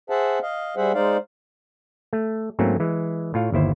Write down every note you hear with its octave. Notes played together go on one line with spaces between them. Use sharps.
G#4 C5 E5 F#5 A5
D#5 F5
G3 G#4 C5 E5 F#5
G#3 D#4 C5 D5 F5
A3
G#2 F#3 A3 A#3 C4 C#4
E3 G#3
A2 F4 C#5 F5
G1 D#2 E4 C5